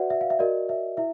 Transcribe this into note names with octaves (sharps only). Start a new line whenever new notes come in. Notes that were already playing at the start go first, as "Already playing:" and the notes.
Already playing: F#4 B4 D5 E5 F#5
E5
F5
E5
F#4 A#4 D5 D#5
E5
E4 E5